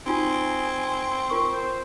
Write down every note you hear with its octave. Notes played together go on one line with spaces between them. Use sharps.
C4 D#4 F4 F#4 G#5
F4 A#4 C#6
C5